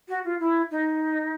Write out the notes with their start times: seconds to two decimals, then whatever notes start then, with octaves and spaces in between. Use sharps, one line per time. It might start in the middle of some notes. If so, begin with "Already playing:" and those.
0.09 F#4
0.25 F4
0.40 E4
0.71 D#4